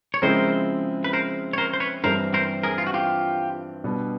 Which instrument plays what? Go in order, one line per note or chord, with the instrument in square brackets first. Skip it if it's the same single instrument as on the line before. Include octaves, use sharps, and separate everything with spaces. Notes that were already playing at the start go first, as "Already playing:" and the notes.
[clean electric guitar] C#5
[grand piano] C#3 F3 G#3 C4 E4 [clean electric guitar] A#4 C5
[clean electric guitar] B4
A#4 C5
C#5
A#4 C5
C5
B4 C#5
[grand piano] G2 E3 G3 C4 [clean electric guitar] A#4 C5
[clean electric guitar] A#4 C5
G#4 A#4
F4
F#4
F4 G4
[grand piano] B2 G3 B3 D4